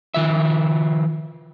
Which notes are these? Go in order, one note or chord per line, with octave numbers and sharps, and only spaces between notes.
D#3 F3 E5